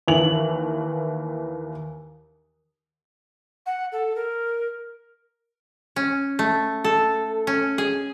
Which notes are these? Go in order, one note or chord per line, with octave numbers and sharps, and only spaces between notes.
D#2 E3 F#7
F#5
A4
A#4
C#4
A3
A4
C#4
G#4